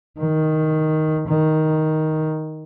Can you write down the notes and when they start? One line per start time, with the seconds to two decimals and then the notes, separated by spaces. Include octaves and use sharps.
0.19 D#3
1.28 D#3